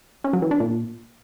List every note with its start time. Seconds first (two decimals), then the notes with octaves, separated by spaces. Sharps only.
0.24 C#4
0.33 F#3
0.42 E3
0.51 D4
0.60 A#2